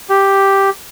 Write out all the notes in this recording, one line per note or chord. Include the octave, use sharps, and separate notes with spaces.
G4